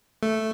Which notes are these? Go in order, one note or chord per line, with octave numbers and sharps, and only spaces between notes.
A3